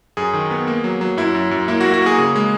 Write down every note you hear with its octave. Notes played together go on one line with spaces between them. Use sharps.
F#2 G#4
D#3
B3
A#3
F#3
F#3
F#2 E4
F#2
F#2
A#3 E4
F#4
A#3
F#4
A#3 G#4
C#3 G#4
G#3